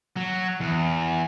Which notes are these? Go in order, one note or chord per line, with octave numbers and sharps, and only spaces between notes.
F#3
E2